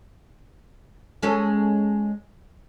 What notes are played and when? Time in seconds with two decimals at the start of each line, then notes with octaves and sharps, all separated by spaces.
1.22 G#3 C#4 A4